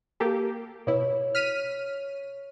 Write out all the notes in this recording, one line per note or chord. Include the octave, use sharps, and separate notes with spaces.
A#3 G4 A4
B2 E4 C#5
F6 B6 D#7